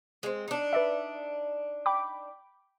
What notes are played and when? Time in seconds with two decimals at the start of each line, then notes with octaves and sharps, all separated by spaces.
0.23 G#3 C4
0.48 D4 D#4
0.73 B4 D5 E5
1.86 G5 B5 D6